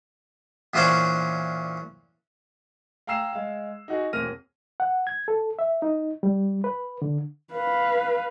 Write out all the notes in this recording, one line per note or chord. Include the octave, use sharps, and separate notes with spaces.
E2 A#2 C#4 D4 C5 C#5
F5 G5 A#5 E6 C7 E7
G#3 F5
D#4 F#4 G#4
E1 A#3 C4 F6 A#6 D#7
F#5
G#6
A4
E5
D#4
G3
B4
D3
B4 F5